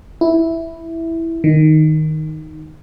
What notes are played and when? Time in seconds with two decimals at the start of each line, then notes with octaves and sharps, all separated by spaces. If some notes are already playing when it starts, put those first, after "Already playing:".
0.21 E4
1.44 D#3